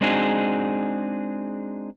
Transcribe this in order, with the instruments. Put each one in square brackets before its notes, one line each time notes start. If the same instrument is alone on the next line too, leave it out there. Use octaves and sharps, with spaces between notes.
[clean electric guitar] G#3 C4 D4 D#4 F#4 G#4